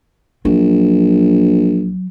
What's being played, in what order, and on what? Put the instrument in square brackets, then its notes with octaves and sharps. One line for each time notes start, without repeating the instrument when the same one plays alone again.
[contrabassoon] A#1 [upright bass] F#3